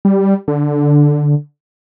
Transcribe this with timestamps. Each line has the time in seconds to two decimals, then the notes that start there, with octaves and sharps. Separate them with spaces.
0.05 G3
0.48 D3